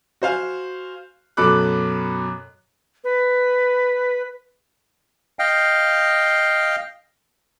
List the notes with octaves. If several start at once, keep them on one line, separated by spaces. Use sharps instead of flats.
F#4 C5 F5 G#5
F#2 B2 A4 B5 D6 F#6
B4
D#5 F5 G5